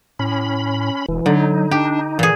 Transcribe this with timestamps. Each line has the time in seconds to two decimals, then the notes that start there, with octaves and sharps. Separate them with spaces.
0.19 A2 C#4 B5
1.09 E1 E3
1.26 D3 F#3 D#4
1.71 D4 G4
2.19 A#2 E3 G#4